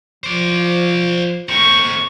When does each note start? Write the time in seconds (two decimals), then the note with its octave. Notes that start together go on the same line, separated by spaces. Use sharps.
0.24 F3 C5 D5
1.49 C4 D#4 C#6